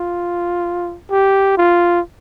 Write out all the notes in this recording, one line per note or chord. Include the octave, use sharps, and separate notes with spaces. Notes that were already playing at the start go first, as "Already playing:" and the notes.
Already playing: F4
G4
F4